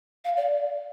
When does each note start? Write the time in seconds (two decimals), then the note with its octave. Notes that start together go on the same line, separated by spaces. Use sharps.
0.25 F5
0.37 D5